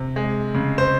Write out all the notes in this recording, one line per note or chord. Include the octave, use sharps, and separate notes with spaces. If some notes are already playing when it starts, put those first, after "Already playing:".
Already playing: C3
G#3
C#3
C5